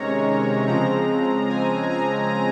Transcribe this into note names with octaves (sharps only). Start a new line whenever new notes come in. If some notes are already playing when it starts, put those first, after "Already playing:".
Already playing: C3 D#3 G#3 C#4 C#5 A#5
C#3 F3 G#3 C4 A#5
G#5
A#5